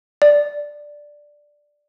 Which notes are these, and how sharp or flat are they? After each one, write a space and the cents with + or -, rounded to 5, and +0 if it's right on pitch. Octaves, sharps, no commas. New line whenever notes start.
D5 +0